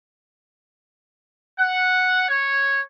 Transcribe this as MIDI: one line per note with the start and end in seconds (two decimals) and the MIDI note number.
1.59 2.24 78
2.29 2.82 73